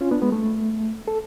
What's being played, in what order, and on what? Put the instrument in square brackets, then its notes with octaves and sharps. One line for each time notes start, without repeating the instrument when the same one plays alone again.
[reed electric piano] C#4 F4
B3 D4
G#3 B3
A3
A4